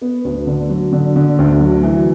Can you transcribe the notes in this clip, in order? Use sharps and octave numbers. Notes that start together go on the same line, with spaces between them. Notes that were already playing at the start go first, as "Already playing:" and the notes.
B3
D2
D3
F#3
D3
D3
D2
F#3
E3